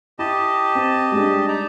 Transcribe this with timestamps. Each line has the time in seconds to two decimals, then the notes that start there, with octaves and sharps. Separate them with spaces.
0.19 E4 G4 D#5 A5
0.75 C4
1.12 G3 G#3 D4
1.48 D#4 D5 A#5